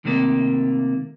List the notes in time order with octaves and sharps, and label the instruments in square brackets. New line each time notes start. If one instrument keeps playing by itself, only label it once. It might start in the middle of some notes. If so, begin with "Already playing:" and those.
[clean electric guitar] C3 D#3 A3 A#3